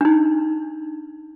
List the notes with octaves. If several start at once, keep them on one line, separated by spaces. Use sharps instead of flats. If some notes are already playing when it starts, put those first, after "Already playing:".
D4 D#4